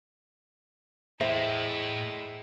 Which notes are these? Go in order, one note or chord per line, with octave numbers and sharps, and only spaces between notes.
E2 A2 G#3 E4 C5 E5 A#6